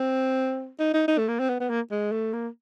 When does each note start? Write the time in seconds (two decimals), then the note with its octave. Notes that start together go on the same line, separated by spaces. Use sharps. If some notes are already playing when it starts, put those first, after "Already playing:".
Already playing: C4
0.79 D#4
0.94 D#4
1.08 D#4
1.18 A3
1.28 A#3
1.40 C4
1.49 B3
1.60 B3
1.70 A#3
1.91 G#3
2.12 A3
2.33 A#3